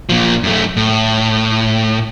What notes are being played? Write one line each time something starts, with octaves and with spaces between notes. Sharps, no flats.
A#2 F3
F#2 A3
A2